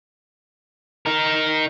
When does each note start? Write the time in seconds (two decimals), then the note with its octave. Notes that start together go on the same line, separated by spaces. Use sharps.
1.06 D#4 A#4